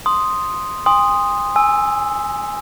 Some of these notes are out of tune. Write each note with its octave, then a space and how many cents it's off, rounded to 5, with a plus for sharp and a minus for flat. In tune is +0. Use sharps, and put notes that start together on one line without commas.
C6 +0 D#6 +0
G#5 -45 C6 +0 D#6 +0
G#5 +0 E6 +0